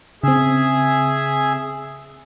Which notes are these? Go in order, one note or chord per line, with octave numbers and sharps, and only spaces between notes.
C#3 C4 G#4 E5